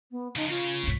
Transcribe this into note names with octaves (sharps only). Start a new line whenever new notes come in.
B3
C#3 F3 D#4
C#3 F4 C#5
C2 G#2